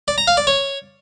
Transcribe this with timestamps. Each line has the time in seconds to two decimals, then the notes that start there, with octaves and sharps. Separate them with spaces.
0.08 D5
0.18 A#5
0.27 F5
0.37 D5
0.47 C#5